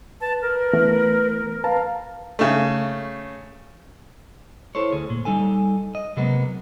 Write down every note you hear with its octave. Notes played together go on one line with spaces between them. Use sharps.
B4 A5
A#4
E3 A3 B3
B4 F5 A5 A#5
C#3 A3
E4 A4 C5 C#5
D2 G#4
A#2
G3 D#4 A4 G#5
D#5
C3 F#3 G#3 A#3 B3